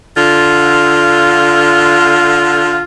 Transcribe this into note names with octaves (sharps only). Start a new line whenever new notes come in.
D3 F4